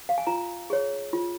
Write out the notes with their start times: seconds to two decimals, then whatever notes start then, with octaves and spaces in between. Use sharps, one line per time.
0.09 F5
0.18 G#5
0.27 F4 A#5
0.70 G#4 C#5
1.13 F4